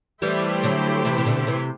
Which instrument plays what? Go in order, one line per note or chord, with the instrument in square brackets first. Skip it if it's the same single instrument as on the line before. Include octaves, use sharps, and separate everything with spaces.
[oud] E3 G3 [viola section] A3 E4 G4 C5
[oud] D3 F#3
C3 E3
C3
B2 D3
C3 E3